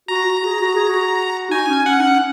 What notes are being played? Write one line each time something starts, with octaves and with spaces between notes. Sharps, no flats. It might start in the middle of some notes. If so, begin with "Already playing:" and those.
F#4 A#5
F#4
G#4
F#4
G#4
F#4
D#4 G#5
C#4
C#4 F#5
D#4
C#4